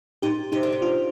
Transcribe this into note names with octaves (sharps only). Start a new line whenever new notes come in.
A#2 D#4 G4
C3 D#4 G4
D3
C3
D4 F4